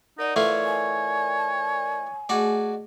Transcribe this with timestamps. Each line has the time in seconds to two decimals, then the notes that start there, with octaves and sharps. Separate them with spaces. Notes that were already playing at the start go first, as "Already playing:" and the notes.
0.19 D#4 A#4 D5 D#5 F#5
0.36 E3 A3 F4 C#5
0.65 G#5
2.29 A3 F#4 G#4 D5 D#5